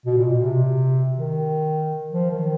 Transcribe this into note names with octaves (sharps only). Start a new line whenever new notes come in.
B2
A#2
B2
C3
D#3
F3
D#3